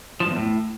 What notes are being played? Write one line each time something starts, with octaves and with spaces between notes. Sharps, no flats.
F3
G2
E2
A2